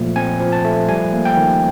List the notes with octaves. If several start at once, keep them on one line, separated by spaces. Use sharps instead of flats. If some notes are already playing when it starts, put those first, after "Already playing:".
Already playing: A#2 F3 A3
C4 G#5
F3
A5
A3
G3 G#5
A#3
G5
D#3